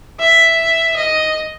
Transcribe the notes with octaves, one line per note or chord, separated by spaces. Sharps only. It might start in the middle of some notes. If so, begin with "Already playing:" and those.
E5
D#5